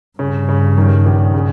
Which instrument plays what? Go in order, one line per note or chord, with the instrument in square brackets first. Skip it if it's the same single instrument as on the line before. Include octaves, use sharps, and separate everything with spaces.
[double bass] G2 [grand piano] C#3
[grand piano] C#3
D#3
A#1
C#3